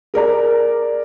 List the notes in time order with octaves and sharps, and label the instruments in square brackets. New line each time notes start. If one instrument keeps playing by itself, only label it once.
[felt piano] G#4 A#4 D5 A#5